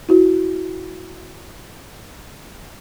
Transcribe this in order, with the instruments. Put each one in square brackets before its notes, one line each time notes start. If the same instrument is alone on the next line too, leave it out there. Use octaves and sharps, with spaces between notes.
[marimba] E4 F#4